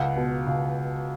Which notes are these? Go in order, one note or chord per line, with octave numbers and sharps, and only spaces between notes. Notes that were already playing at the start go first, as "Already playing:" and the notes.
Already playing: C#2 F#5
B2
C#2